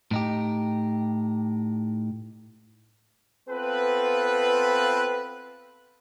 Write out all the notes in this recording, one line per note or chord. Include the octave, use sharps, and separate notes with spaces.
A2 D#4 G4
B3 C4 F4 A4 B4